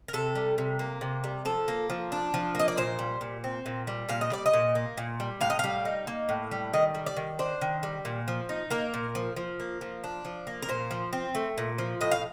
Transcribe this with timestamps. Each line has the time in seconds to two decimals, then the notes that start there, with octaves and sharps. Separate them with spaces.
0.08 A#4
0.13 C3 A4
0.35 G3
0.58 C3
0.79 A#3
1.01 C3
1.24 G3
1.45 F3 A4
1.68 A#3
1.90 F3
2.12 D4
2.34 F3
2.55 A#3 D#5
2.68 D5
2.77 A#2 C5
2.99 G3
3.21 A#2
3.44 C4
3.66 A#2
3.87 G3
4.09 A#2 F5
4.21 D#5
4.32 G3 D5
4.46 D#5
4.53 A#2
4.75 A#3
4.97 A#2
5.20 G3
5.41 A2 F5
5.50 D#5
5.59 G3 F5
5.85 D#4
6.07 A#3
6.29 A2
6.51 G3
6.73 D#3 D#5
6.95 G3
7.06 D5
7.17 D#3
7.39 D4 C5
7.61 D#3
7.83 G3
8.05 A#2
8.28 F3
8.49 D#4
8.70 A#3 A#4
8.94 A#2
9.15 F3
9.36 F3
9.60 A#3
9.81 F3
10.04 D4
10.25 F3
10.47 A#3
10.62 A#4
10.69 A#2 C5
10.91 F3
11.13 C4
11.35 A3
11.58 A#2
11.78 F3
12.01 A2 D#5
12.11 F5